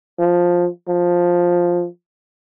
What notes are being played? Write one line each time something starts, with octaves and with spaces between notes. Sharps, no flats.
F3
F3